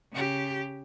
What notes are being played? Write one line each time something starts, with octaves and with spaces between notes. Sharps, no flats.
C#3 G4